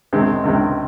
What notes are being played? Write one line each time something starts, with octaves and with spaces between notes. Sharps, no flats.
C#2 C3 D#3 G#3 C4
C#2 C3 D#3 G#3 C4